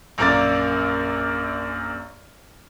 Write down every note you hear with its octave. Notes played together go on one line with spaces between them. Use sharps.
A#1 F#2 A#3 A#4 D5 A6